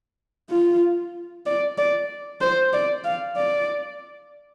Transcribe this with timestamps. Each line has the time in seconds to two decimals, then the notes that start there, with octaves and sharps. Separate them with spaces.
0.50 F4
1.46 D5
1.78 D5
2.41 C5
2.73 D5
3.04 F5
3.37 D5